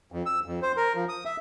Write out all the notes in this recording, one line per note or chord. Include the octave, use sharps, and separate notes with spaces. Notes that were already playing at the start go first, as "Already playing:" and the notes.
F2
E6
F2
C5
A#4
F3
D#6
E5